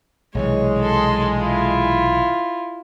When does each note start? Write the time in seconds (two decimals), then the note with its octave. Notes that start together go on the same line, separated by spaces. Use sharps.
0.35 B1 C3 E3 G#3 C#5
0.81 A4 C6
1.38 E4 F4